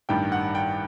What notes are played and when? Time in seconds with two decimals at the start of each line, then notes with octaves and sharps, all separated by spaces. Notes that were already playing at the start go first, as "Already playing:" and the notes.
0.09 A1 G2 D#3 G3 G5
0.32 F#5
0.55 G5